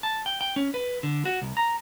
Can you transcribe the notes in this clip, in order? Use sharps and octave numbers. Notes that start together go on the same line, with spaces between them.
A5
G5
G5
C#4
B4
D3
F#4
C2
A#5